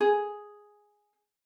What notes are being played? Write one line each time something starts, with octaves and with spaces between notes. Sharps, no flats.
G#4